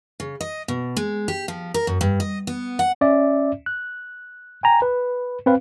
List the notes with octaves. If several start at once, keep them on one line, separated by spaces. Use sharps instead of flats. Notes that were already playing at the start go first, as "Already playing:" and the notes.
C#3
D#5
B2
G#3
G4
F3
A#4
F#2
G2
D#5
B3
F#5
C#4 D5 E5
F#6
G5 G#5 A#5
B4
C4 B4 F5